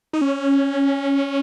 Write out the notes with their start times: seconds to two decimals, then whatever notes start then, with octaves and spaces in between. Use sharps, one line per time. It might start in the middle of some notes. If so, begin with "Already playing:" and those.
0.13 D#4
0.21 C#4